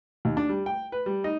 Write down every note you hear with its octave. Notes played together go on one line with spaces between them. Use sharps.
D#2
D4
G3
G5
B4
G3
D#4